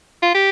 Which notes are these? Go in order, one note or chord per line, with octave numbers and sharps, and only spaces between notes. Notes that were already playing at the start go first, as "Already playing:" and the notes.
F4
G4